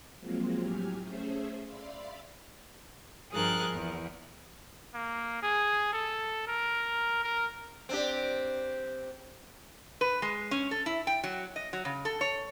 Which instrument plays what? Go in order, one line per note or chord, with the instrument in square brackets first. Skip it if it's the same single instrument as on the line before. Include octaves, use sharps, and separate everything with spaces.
[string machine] F3 F#3 G#3 A#3 C4 F4
A2 F#3 G4 G#5 F6
A3 C#4 G#4 C5 E5
D5 E5 F5 B5 C6
[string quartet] G2 F3 G#4 A#4 F#6 A6
E2
[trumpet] A#3
G#4
A4
A#4
A#4
[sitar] C4 D4 G4
[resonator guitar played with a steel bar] B4
G#3
C#4
A4
E4
G5
F#3
D#5
F#3
C#3
A4
C#5